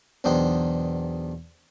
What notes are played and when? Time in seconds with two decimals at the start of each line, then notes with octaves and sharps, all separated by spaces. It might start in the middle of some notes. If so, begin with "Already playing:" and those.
0.24 B1 E2 D4 D#4 C5 G5